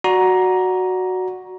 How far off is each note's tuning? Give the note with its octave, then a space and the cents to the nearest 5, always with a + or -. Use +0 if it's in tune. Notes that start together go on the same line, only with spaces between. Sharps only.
F#4 +0 D5 +0 A#5 +10